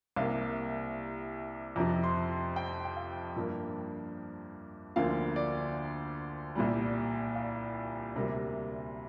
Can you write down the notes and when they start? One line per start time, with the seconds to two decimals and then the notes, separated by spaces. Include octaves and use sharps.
0.16 C2 C3 A#3 F5
1.76 F2 C3 F3 A#5
2.03 C6
2.56 G5
2.85 G5
2.96 F5
3.36 G2 F3 A#3
4.96 D2 D3 F3 A#3 F5
5.36 D5
6.55 C2 A#2 G3
7.35 F5
8.15 D2 C3 G3 A#3